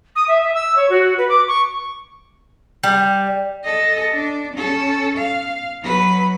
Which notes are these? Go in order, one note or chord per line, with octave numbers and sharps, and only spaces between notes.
D#6
E5
E5
E6
C#5
F#4
B4
D6
C#6
G3
A4 D#5
D4
C#4 A4
F5
F#3 B4